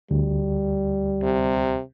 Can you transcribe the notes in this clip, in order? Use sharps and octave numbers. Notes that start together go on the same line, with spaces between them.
D2 G3
C3